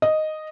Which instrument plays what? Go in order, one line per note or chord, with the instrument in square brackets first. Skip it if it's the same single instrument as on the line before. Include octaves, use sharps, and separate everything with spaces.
[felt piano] D#5